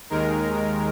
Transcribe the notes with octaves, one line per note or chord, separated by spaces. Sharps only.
D#2 D#3 G#3 A#4